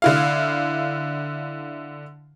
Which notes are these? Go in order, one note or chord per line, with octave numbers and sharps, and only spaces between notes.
D3 E4 F5